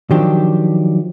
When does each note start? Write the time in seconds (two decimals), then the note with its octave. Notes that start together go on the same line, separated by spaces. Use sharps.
0.11 D#3 F3 F#3 D4 G4